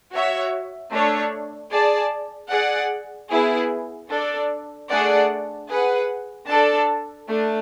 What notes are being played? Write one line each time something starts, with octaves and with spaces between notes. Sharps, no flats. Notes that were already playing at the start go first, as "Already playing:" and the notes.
F#4 C#5 E5
A3 D4 A4 C#5
G#4 D5 A5
G#4 D5 F#5
B3 E4 G#4
D4 A4 D5
A3 D4 G#4 D5 F#5
G#4 B4 F#5
D4 A4 D5 A5
A3 D4